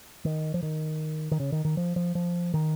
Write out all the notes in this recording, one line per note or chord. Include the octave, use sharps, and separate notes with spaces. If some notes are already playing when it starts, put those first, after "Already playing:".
D#3
F3
D#3
D#3
C#3
D#3
D#3
F3
F3
F3
D#3